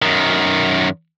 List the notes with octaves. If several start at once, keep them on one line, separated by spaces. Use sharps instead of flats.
F#2 D#3